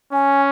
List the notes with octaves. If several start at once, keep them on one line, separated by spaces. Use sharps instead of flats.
C#4 G#5